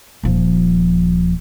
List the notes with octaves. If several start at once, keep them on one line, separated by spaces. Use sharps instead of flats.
D#1 F3